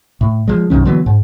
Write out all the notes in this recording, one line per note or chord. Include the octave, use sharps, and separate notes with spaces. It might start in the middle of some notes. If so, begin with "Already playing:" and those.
A2
F3 G#3
B1 F#2 D#3 C#4
D3 E3 F#3 B3
G#2